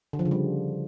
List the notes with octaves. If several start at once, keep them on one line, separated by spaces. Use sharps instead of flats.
D3
F3
C#3
G3